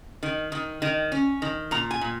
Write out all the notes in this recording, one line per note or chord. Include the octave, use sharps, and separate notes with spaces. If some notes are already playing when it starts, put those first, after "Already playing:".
D#3
D#3
D#3
C#4
D#3
A#2 A#5
G#5
A#2